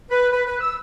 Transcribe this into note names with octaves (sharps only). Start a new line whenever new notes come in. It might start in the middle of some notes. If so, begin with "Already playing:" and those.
B4
B4
B4
E6